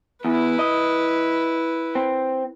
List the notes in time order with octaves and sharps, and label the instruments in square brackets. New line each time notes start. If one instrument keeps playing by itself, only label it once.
[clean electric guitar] E2 [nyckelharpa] E4 B4
[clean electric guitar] D#5
C4